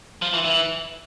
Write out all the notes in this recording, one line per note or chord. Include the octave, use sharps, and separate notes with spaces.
F3
E3
E3